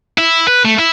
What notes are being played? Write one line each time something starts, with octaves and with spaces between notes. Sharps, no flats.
E4
B4
A3
E4